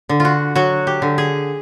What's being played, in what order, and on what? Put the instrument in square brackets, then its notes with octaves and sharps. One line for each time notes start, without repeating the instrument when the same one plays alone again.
[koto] D3
F4 F#4
F#3 F#4
G4
D3
G#4